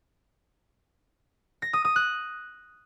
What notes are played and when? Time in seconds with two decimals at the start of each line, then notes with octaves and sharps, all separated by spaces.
1.62 A#6
1.73 D#6
1.85 D#6
1.96 F#6